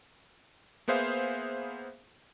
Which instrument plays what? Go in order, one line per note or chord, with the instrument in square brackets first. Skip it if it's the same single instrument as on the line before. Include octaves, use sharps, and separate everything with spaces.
[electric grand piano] A#3 B3 G#4 C5 E5 F5